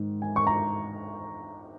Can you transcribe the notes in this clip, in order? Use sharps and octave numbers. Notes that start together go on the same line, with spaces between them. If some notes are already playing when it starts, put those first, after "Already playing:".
Already playing: G#2 D#3
G#5
C#6
A#5